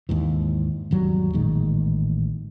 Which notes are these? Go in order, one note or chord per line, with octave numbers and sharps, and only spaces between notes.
D#2 G#2 E3
G#1 E2 F#3 G3
A1 A#2 D#3 G#3